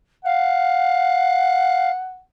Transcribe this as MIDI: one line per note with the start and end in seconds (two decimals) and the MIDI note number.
0.25 1.90 77
0.25 2.20 78